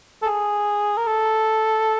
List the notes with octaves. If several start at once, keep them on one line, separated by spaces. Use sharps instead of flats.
A4
G#4
A#4
A4